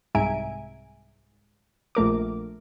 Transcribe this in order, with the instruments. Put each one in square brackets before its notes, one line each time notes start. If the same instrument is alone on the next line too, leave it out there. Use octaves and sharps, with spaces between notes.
[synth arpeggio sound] C2 G#2 E5 G#5 A#5 D7
A#1 A3 A#4 D6